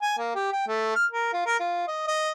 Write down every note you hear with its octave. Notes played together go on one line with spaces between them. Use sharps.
G#5
A#3
G4
G5
A3
F6
A#4
F4
A#4
F4
D#5
D#5